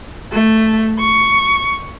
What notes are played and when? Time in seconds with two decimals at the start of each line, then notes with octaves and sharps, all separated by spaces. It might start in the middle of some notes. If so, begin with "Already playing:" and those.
0.32 A3
0.99 C#6